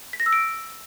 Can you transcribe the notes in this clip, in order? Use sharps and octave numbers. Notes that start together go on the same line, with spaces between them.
B6
A#6
E6
D7